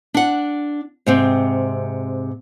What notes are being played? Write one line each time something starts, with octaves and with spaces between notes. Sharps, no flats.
D4 F#5
G#2 C3 C4